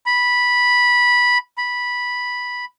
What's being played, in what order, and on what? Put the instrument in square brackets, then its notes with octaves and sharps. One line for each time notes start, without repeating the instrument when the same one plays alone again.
[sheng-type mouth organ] B5
B5